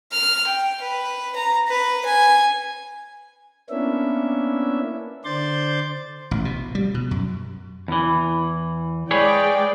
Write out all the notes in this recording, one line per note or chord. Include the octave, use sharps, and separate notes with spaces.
F6
G5
B4
A#5
B4
G#5
A#3 B3 C#4 D4 E4 E5
D3 C5 D5 C6 G6 A6
A1
B2
G3
B2
F#2
E2 E3
G#3 G#4 B4 C#5 D5 G5